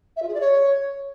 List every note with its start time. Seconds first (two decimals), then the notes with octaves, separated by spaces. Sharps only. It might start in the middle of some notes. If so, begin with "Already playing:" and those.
0.16 E5
0.22 F4
0.28 G#4
0.34 D5
0.40 C#5